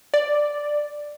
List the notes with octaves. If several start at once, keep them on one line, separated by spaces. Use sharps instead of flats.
D5